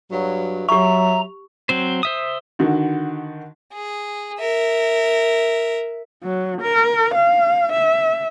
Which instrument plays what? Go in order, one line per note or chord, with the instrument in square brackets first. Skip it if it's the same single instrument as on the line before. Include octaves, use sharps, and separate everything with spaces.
[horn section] G2 F#3
[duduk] F#3 [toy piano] G4 C#6 [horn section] E5 [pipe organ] A#5
[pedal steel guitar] F#3 C4 C5
C5 E5 D#6
[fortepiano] D3 D#3 F#4
[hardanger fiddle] G#4
A#4 E5
[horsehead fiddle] F#3
A#4
F5
E5